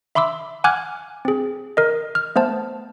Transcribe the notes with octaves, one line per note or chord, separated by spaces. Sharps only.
E5 B5 C6 D6 E6
F#5 G#5 D6 F6 F#6 G#6
C4 G#4
A#4 D#5
F6
A3 B3 C5 A5